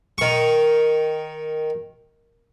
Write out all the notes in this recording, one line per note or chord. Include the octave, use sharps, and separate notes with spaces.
D#3 C#6